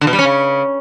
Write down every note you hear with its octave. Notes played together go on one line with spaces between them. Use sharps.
D3
B2
G3
C#4
C#3